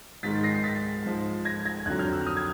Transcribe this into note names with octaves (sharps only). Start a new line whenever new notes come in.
G#2 D#3 G#3 A6 B6
A#6 C7
C7
A6 B6
G#2 F3 G#3
G#6 A#6
G#6 A#6
F2 D3 F#3 F#6 G#6
F6 G6
E6 F#6
D#6 F6
G#6